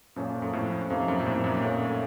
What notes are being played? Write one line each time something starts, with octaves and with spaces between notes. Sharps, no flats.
F#2 A#2 F3 A#3 C#4 A4
F#2
F2 A2
F2 C3 F3 A#3 D#4
F#2
A#2
F2 A2
F#2 A#2
F#3 A3 C#4